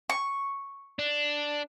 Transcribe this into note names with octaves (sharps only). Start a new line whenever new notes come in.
C#6
D4